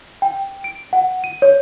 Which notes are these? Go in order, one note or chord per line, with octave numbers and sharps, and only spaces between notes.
G5
D7
F#5
D#7
C#5